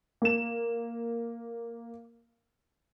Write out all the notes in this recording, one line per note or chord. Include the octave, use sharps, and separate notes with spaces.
A#3 E7